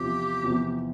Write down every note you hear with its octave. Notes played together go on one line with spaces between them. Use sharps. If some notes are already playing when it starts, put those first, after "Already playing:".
Already playing: E2 C3 F3 C4 G4
E2 C3 F3 C4